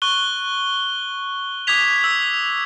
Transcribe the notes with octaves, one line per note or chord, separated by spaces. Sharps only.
C#6 F#6 G7
D6 D#6 F#6 G#6 B6 F7
E6